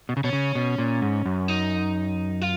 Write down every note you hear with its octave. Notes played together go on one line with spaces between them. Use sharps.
B2
C#3
B2 C#4
C#3
B2
A#2
G#2
F#2
D#4
F4